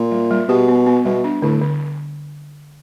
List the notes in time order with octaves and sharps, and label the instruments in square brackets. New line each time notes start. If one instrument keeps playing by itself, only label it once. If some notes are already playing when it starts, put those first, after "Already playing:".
Already playing: [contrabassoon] A#2
[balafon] G3
G3
[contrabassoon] B2 [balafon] G4
[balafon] B3
B3
[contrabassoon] B2 [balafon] G3
[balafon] D4
[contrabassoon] A2 [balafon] D3
[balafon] D3